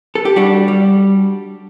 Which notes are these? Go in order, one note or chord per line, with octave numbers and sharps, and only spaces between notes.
A4
G4
G3 D4 F#4
G3